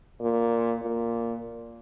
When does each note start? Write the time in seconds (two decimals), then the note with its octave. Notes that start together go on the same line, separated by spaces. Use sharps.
0.21 A#2
0.82 A#2